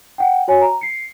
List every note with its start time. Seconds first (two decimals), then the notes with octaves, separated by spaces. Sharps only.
0.18 F#5 G5
0.48 F#4 C#5 G#5
0.61 A#5
0.81 C7 C#7